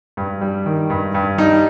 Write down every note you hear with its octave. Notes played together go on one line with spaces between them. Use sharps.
G2
G3
D#3
G2
G2
G3 D#4